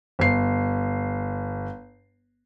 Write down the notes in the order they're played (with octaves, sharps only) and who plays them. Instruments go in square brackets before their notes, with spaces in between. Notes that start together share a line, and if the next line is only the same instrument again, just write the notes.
[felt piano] G1 C7